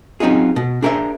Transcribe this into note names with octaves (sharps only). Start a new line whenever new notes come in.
F#3 C4 C#4 D#4 F4 G#4
B2
D4 G#4 A#4 C5 C#5 E5